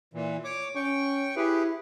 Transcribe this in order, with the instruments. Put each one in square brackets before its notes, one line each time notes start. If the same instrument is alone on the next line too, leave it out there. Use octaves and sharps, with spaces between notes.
[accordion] A#2 E3
C#5 D6
[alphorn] C#4 [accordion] G5 C#6
[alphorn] E4 [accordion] G4 G#4 B4